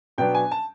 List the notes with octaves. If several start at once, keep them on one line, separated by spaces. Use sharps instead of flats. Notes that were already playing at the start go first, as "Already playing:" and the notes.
B2 F#3 B3 D4 G5
G#5
A5